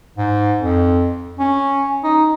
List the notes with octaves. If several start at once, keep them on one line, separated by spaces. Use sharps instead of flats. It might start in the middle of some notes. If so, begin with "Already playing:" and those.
G#2
F2
C#4
D#4